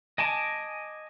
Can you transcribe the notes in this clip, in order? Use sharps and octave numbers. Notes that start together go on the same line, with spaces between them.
D#5 G#5 A5 D6